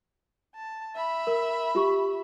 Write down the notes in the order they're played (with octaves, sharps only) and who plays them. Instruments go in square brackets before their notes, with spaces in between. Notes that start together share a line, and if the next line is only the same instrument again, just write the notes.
[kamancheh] A5
E5 B5
[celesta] A#4
F4 G4 C#6